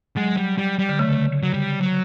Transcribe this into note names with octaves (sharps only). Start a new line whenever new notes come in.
F#3 G#3
G3
G3
G3
D3
C#3 A3
F#3
G3
F#3